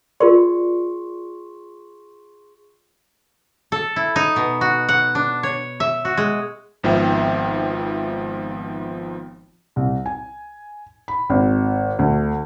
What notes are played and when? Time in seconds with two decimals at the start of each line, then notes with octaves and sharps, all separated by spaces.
0.20 F4 G#4 A#4 D5 C6 C#6
3.72 A4
3.96 E4
4.16 D#4
4.36 B2
4.61 F#4
4.89 F#5
5.15 D4
5.43 C#5
5.80 E5
6.05 F#4
6.17 G#3
6.83 G#1 G#2 F3 B3 E5 G5
9.76 C2
10.06 G#5
11.08 B5
11.30 G#1
11.99 D2